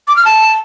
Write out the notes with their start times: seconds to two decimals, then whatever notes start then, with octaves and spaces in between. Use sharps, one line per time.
0.08 D6
0.16 F6
0.25 A5